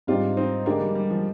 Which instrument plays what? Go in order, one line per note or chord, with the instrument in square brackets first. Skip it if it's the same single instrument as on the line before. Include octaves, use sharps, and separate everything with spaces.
[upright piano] G#2 G3 C4 D#4 G4 [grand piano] D4 F4
[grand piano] C4 D#4
[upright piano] D3 G#3 D#4 G4 [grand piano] A#3 D4
[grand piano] G3
G3
F3